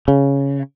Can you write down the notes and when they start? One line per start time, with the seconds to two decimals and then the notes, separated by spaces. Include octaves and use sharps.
0.08 C#3